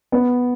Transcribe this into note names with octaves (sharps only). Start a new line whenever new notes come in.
B3